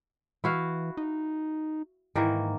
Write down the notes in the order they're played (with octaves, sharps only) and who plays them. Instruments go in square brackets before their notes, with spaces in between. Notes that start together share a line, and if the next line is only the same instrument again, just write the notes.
[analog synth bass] E3 [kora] E4 F#4 F5
[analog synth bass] D#4
[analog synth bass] G#2 [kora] D#3 E3 A#3